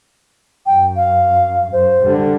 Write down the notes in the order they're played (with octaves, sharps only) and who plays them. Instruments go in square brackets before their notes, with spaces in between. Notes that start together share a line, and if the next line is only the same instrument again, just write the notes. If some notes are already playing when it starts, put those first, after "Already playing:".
[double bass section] F#2 [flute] G5
[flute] F5
[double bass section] F#2 [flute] C5
[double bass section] D3 G3